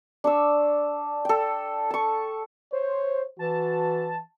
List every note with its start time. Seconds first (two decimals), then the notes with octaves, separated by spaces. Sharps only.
0.24 D4 C#6 E6
1.25 A4 G5
1.91 A5 C#6
2.73 C5 C#5
3.39 E3 F#4 A5